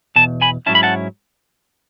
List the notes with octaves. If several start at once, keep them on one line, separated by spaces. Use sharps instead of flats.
E2 B2 A5
G#5 B5
G#2 D#3 F#3 C#4 E4 A5
B5
F#5 A5